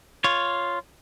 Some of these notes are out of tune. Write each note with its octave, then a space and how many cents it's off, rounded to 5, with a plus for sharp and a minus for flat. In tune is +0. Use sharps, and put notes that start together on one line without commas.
F4 +0 C#5 +0